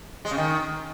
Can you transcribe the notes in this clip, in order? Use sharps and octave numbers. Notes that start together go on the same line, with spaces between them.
G#3
C#3
D#3